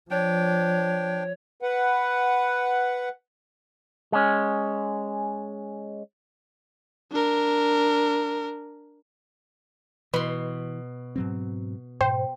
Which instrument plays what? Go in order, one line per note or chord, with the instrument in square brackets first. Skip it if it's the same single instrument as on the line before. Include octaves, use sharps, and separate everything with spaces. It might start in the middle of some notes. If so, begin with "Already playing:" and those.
[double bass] F3 [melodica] D4 G5 [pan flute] C#5
[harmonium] B4 F#5
[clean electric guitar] G#3 C#4
[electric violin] D4 A#4
[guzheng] B2 C6 [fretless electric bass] E3 [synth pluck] B4
[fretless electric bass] G#2 F#3 C4
[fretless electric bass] G#2 B2 [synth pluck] C5 [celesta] G5